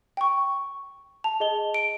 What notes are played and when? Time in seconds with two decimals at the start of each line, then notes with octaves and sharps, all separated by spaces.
0.17 G5 C#6
1.24 A5 F7
1.40 G#4 D#5 G7
1.74 D7